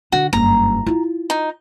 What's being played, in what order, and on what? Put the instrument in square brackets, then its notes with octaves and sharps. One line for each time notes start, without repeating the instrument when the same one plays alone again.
[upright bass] D3 [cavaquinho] F#4
[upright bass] F#1 G2 [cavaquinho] A#5
[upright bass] E4 F4
[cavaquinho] D#4